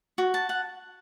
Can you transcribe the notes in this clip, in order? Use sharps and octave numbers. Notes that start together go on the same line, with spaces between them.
F#4
A5
F#5